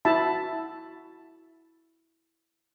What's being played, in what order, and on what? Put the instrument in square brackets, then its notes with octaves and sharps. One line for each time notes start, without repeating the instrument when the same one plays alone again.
[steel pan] E4 F#4 E5 A5 B5